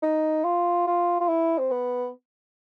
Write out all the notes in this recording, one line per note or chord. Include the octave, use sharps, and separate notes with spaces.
D#4
F4
F4
F4
E4
C4
B3